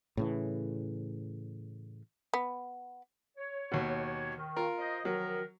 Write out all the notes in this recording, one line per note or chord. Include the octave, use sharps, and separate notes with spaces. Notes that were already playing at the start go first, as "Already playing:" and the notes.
A2 C#3 E3
B3
C#5
D#2 B2
D#3
F4 A#4
C5 D#5
D#3 F3 F#3 A#4